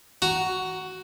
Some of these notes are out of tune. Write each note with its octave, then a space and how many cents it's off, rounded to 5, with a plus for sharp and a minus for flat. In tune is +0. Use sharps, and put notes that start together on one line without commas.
F#4 +10 A#5 +0